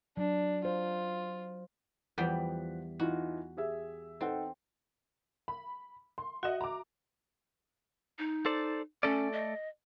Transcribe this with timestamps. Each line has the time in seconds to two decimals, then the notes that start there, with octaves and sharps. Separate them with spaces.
0.17 F#3 D4
0.65 F4 C5
2.18 E2 F3 G3 F#5 G5 B6
2.99 E3 D#4 F4 F#4
3.57 G4 G#4 E5
4.21 C4 D#4 A4 F#5
5.48 B5
6.18 C6
6.43 F#4 D#5 E5 F#5
6.61 A#5 D6
8.19 D#4
8.46 A4 C5 D5
9.03 A3 C#4 A4 D5
9.33 D#5